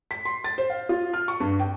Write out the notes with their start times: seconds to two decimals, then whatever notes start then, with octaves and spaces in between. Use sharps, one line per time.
0.11 B6
0.25 C6
0.44 A6
0.58 C5
0.70 F5
0.89 F4
1.14 F6
1.28 C#6
1.40 G2
1.60 G5